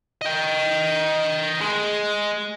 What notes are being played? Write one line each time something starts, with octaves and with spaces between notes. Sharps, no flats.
D#5 G5
G#3